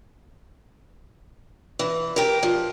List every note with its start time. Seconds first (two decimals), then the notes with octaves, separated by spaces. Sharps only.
1.79 E3
2.16 G4 A#4
2.43 F3